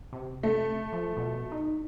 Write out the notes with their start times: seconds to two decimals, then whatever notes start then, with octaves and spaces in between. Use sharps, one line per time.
0.13 C3
0.43 A3
0.93 F3
1.17 B2
1.52 D#4